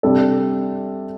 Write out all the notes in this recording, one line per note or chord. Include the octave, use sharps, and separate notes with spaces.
C3 G3 D4 A4